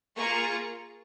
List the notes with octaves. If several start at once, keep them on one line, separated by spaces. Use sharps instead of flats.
A#3 F4 G#4 C#6